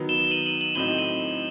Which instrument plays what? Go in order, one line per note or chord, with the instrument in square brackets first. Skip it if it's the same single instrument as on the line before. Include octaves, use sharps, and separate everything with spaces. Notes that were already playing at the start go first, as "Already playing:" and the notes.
Already playing: [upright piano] D#3 F#3 B3
[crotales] E7 G7
D#7 F#7
D#7 F#7
D#7 F#7
[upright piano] A2 F#3 C4 D#4 [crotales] E7 G7
[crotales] D#7 F#7